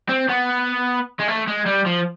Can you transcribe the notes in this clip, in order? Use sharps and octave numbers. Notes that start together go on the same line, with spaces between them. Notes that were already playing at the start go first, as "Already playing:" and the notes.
C4
B3
G#3
A3
G#3
G3
F3